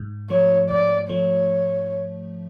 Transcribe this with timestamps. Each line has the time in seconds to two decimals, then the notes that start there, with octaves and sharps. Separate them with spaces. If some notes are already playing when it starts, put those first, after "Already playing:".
Already playing: G#2
0.30 F3 A3 C#5
0.70 G#2 D5
1.09 F3 A3 C#5